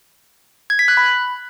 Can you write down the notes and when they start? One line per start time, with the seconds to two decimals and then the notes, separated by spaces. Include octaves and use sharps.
0.70 G#6
0.79 B6
0.88 F#6
0.97 B5